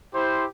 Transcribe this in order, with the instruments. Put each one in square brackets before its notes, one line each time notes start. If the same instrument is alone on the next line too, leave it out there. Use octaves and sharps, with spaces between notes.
[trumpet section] E4 G4 C5